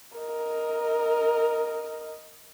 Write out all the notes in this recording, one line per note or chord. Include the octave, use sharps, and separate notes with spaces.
A#4 D#5